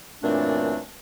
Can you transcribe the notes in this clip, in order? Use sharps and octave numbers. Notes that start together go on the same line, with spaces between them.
F#2 A#2 E3 A3 C4 D4